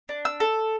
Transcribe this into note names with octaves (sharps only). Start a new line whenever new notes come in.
D4
E6
A4